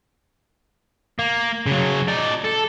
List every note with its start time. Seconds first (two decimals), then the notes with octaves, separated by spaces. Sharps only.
1.19 A#3
1.67 C#3 F#3
2.08 D#4 D5
2.45 A4